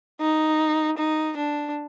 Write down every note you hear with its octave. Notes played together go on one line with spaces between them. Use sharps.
D#4
D#4
D4